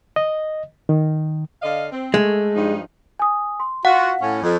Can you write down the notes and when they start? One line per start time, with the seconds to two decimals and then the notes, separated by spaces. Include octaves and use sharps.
0.16 D#5
0.89 D#3
1.62 D3 D#5 F5
1.92 C4
2.14 G#3 A3
2.55 G2 F3 D#4
3.19 G#5 D#6
3.60 C6
3.85 F4 F#4 F5 F#5
4.21 A2 C#4
4.43 F2